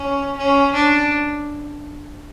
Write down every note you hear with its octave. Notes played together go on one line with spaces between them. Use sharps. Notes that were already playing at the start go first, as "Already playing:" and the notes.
Already playing: C#4
C#4
D4